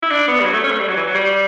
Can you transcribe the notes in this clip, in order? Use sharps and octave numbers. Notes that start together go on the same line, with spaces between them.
E4
D4
B3
G3
F#3
A3
C#4
A3
G3
F#3
E3
F#3
G3